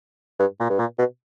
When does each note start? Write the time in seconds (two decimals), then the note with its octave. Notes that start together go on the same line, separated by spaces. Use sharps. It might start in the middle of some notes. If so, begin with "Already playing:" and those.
0.39 G2
0.60 A#2
0.70 G2
0.79 A#2
0.98 B2